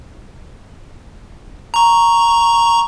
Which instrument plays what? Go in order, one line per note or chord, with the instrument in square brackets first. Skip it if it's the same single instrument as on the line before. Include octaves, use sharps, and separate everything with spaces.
[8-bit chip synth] A#5 C#6